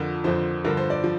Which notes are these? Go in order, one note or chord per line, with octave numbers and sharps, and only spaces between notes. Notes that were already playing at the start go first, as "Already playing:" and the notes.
Already playing: F2 D3 F3 A#4
F2 D3 F3 C5
G2 D3 F3 A#4
C5
D5
F3